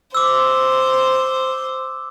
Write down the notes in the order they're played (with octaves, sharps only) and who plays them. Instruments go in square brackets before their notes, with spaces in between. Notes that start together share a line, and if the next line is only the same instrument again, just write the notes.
[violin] C5 [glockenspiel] D6 E6